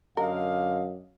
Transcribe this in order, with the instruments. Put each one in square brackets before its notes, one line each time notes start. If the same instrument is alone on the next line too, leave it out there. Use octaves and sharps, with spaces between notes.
[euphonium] F#2 [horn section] D3 F5 [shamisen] A#4 [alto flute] D#5